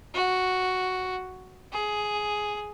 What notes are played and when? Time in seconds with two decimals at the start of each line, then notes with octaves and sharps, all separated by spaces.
0.14 F#4
1.72 G#4